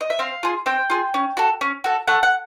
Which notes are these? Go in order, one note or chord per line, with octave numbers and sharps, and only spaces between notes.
D#5
E5
C4 F5
F4 G#4
C4 G5
F4 G#4
C#4
F#4 A4
C#4
F#4 A4
A3 F#5
F#5